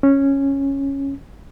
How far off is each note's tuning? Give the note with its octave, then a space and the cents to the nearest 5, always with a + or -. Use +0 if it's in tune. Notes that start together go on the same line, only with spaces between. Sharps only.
C#4 -5